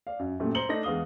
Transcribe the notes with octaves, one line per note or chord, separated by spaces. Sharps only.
D5 F5
F#2
F#2 A#2 G3 A3
C5 A#5 C#7 F#7 G7
A3 D4 D#4 A#6
E2 G#3 F5 D#6 G7